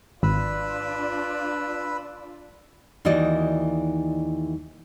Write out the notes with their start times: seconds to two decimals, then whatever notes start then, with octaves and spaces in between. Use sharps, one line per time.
0.23 G#1 D4 F4 B4 D5 B5 E6
3.05 D#2 E3 D#4 F#4 D5 D#5